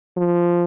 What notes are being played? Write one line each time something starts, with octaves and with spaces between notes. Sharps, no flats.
F3